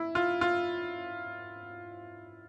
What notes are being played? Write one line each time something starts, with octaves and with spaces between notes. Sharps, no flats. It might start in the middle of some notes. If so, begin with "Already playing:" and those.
Already playing: E4
F4
F4